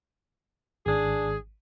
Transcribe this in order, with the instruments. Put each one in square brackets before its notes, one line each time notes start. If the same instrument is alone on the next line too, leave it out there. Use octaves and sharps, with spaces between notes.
[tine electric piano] G#1 [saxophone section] D4 G#4